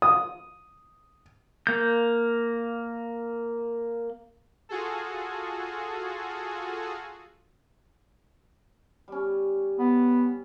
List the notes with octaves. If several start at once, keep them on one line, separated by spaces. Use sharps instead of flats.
D#6
A#3 G6
F4 F#4 G#4 A4
G3 C#4
B3